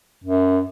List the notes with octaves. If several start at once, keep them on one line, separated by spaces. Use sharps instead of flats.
F#2